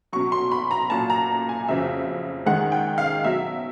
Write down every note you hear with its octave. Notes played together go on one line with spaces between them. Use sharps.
B2 F#3 C#6
C6
B5
A#5
A#2 F#3 A5
A#5
G#5
F2 C#3 F#3 E5
G#2 D#3 G#3 F#5
G5
F5
B2 F#3 E5